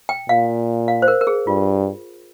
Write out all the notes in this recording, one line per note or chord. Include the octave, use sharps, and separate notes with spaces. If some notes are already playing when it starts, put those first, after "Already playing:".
G5
A#2 F5
F5
C5
A#4
A#4
G#4
G2 F4